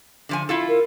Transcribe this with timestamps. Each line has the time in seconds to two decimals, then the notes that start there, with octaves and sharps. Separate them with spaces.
0.29 D3 F3 G#5
0.49 E4 F4 A4
0.69 A#4